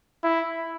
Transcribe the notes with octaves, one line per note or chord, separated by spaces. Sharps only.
E4